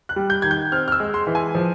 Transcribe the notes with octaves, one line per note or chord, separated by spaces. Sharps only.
F#6
G3
G6
D#3 G#6
G6
C4 F6
F6
E6
G#3
C6
E3
G#5
F3